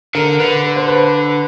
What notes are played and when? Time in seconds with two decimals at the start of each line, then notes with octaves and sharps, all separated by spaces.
0.15 D3 A#4
0.39 D3 B4
0.63 B4
0.76 C5
0.88 B4